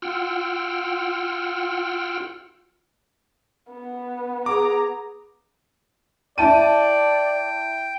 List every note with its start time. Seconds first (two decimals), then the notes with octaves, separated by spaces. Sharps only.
0.02 F4 F#5 G5 E6 F6
3.71 B3
4.46 G#4 A#5 D6
6.38 E4 D5 G5 A5 D#7